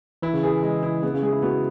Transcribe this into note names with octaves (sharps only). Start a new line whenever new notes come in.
E3 E4
C#3
E3 G#4
G#3
E4
C#3 B3
C#3
G#3 G#4
E4
B3 F#4